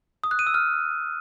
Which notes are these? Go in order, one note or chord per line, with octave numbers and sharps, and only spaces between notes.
D#6
F#6
D#7
E6
F6